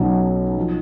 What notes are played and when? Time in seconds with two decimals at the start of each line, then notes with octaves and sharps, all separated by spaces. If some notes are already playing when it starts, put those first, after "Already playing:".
Already playing: B1 B2 F#3 C#4
0.57 F3